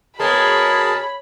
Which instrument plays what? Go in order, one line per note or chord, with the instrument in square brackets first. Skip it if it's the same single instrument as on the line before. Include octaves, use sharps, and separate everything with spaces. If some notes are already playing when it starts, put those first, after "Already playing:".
[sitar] B2 G#3 [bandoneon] G#4 A#4 A5 [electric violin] C#5 [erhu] B5